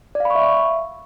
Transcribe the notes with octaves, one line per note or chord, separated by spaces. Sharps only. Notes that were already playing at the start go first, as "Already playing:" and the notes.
D5
F5
B5
C#6
E5